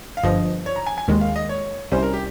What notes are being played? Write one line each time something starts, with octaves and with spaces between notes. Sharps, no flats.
F5
G1 G2 F3 D#5
C#5
A#5
G#5
G#5
D#2 D#3 G#3
F5
D#5
C#5
C2 C3 G3 C#4 C5
A#4
G4